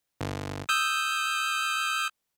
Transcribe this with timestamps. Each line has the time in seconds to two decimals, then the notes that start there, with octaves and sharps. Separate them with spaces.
0.21 G1
0.69 D#6 E6 G6